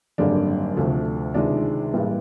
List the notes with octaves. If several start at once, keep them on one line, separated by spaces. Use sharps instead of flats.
G#1 F#2 D3 G3 A#3 D4
D2 C3 F3 A3
C#2 C3 D#3 G#3 D4
A1 G2 E3 G3 A#3